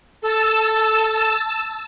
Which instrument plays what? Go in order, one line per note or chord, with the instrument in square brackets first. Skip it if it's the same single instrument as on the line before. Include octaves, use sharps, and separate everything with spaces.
[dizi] A4 [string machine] A5 E6